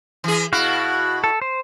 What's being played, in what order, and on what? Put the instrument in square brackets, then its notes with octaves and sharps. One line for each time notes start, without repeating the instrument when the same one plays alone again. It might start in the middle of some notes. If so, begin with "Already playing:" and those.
[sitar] E3 G#4
[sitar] B2 E4 [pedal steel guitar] F#4 F5
[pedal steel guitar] A4
C5